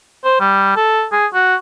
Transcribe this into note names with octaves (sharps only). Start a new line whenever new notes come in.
C5
G3
A4
G#4
F#4